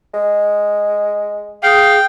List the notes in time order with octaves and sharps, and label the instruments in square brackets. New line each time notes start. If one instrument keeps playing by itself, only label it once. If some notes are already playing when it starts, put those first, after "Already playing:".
[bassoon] G#3
[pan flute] G#4 [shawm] F5 [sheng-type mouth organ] G5